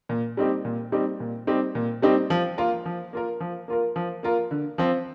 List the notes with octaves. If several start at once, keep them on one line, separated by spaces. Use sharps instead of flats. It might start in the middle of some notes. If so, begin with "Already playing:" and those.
A#2
G3 C4 D#4 G4
A#2
G3 C4 D#4 G4
A#2
G3 C4 D#4 G4
A#2
G3 C4 D#4 G4
F3
A#3 F4 A#4
F3
A#3 F4 A#4
F3
A#3 F4 A#4
F3
A#3 F4 A#4
D3
F3 C4